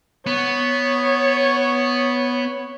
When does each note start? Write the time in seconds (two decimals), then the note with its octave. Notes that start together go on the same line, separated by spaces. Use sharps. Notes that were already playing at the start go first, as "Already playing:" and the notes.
0.26 B3 C#5